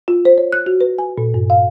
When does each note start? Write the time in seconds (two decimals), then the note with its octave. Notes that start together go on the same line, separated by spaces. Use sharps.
0.08 F4
0.25 C5
0.38 C#5
0.53 F#6
0.66 F#4
0.81 B4
0.98 G#5
1.18 A#2
1.34 G2
1.50 F5